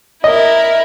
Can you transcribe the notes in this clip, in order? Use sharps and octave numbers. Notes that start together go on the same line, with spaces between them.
E4 A#4 D#5